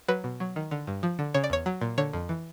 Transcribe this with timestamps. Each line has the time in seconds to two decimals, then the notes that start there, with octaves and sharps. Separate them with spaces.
0.08 F#3 B4
0.24 B2
0.40 F#3
0.56 D#3
0.71 D3
0.87 G2
1.03 F3
1.19 D3
1.34 C#3 C#5
1.44 D5
1.50 E2 C#5
1.66 F#3
1.81 A#2
1.98 D3 C#5
2.13 F2
2.29 E3